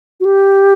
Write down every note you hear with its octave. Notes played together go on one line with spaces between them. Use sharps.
F#4
G4